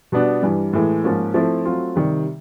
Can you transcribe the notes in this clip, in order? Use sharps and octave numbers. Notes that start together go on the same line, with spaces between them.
B2 G3 B3 D4
G2 E3 G3
A2 E3 G#3
G#2 F3 A#3 C#4
F3 A3 C4 E4
F#3 A3 C4 F4
C3 D#3 G3